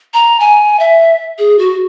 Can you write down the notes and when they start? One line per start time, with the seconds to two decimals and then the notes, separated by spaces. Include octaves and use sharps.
0.14 A#5
0.40 G#5
0.80 E5
1.39 G#4
1.59 F#4